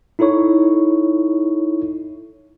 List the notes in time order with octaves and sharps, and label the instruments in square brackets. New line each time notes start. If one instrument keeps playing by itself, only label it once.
[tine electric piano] D#4 E4 A4 C#5 C#6